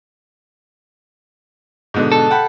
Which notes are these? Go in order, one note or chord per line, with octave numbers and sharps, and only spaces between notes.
G#2 B2 D3
A4
F#5 G5 B5